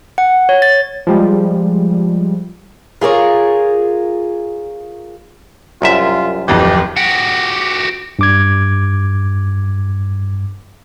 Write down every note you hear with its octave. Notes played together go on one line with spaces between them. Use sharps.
F#5
C#5
A6
F3 G3 G#3
F4 G#4 A#4 C#5
C2 F#2 F4 E5
D1 F2 E3 G4
F#4 G4
G2 D6 G#6